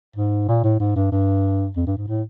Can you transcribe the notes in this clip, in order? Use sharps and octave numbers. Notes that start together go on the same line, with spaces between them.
G#2
A#2
A2
G#2
G2
G2
F2
G2
G#2
A2